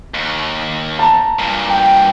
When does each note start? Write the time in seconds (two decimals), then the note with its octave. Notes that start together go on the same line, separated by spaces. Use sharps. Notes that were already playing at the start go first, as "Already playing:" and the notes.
0.14 D#2
0.99 A5 A#5
1.39 G2 A#2
1.69 G5